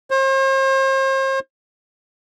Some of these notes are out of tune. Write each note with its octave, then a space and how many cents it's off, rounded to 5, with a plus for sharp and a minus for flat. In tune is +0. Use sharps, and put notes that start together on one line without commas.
C5 +40